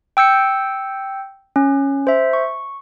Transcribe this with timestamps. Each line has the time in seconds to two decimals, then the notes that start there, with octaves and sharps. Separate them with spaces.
0.17 G5 E6 G6 C#7
1.56 C#4
2.07 C5 E5
2.33 C#6